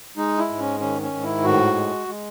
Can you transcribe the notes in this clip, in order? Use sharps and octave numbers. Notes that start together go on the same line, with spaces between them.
G#3 D#4
E4
G#2
C#4
D#3 C#4
C#4
G#2
E4
A2 F#4
G#3
G#3